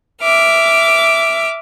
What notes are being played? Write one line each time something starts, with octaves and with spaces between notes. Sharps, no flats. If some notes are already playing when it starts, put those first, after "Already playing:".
E5 D6 F6